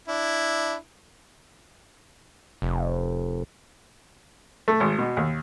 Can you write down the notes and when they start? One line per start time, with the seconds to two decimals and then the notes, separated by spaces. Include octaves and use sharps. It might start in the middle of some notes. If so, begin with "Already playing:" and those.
0.08 D4 E4
2.62 F1
4.68 A3
4.80 G#1
4.98 B2
5.17 D#2